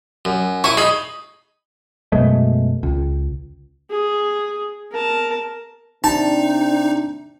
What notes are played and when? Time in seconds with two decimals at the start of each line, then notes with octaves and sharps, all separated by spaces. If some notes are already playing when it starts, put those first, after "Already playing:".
0.25 F#2
0.64 E4 C#6 D#6
0.77 D#4 G#4 B5
2.12 F#2 B2 G#3 A3
2.83 C#2
3.90 G#4
4.92 A#4 A5
6.04 C3 D4 D#4 A5